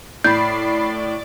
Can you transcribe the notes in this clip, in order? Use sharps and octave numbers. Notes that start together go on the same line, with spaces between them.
A2 D5 B5 G6 A6 C7